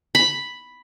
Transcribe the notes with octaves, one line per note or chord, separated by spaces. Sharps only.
B5